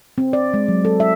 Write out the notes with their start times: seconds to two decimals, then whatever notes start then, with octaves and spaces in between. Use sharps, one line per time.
0.18 C4
0.33 D5
0.54 G#3
0.68 F#3
0.85 A4
1.00 E5